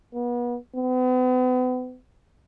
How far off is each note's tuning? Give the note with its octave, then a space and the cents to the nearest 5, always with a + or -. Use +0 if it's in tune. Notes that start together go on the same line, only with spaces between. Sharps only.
B3 -35
B3 +40